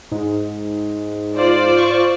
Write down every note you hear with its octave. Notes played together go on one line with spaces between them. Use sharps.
G#2
F4 C5 D5
C#6